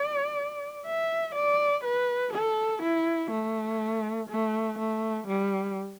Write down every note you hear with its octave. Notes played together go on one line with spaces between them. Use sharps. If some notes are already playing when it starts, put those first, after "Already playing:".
Already playing: D5
E5
D5
B4
A4
E4
A3
A3
A3
G3